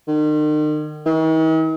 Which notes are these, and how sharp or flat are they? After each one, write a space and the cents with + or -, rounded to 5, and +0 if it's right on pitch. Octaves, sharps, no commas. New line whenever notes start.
D#3 -40
D#3 +45